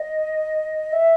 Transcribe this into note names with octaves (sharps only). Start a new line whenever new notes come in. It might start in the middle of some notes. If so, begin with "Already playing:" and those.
Already playing: D#5
E5